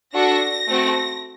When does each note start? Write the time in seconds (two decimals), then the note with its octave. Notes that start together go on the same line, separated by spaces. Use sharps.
0.13 D4 F#4 A4 A#6
0.68 A3 C4 F#4 A4